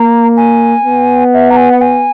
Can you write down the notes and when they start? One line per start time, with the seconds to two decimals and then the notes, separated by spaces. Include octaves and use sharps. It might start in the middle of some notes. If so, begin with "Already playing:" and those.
Already playing: A#3 A#5
0.37 G#5
0.85 B3
1.34 E5
1.50 A#5
1.57 G#5
1.72 F#5
1.81 G#5